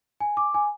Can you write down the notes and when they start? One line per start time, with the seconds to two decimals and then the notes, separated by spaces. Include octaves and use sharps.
0.20 G#5
0.37 D6
0.54 G#5